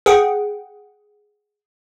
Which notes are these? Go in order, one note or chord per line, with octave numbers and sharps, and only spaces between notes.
G#4 F#5 G5